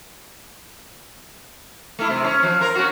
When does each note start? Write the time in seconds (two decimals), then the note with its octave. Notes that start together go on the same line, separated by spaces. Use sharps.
1.99 A3 E4
2.10 C3
2.24 C#4
2.43 F3
2.60 F4 A#4
2.75 C#4 F#4